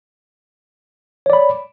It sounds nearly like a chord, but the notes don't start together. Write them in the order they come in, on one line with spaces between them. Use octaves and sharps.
C#5 D5 B5